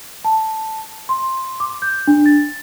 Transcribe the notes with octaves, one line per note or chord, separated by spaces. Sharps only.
A5
C6
D6
G6
D4
A6